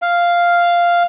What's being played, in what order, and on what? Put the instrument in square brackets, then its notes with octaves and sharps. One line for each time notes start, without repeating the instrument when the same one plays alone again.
[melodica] F5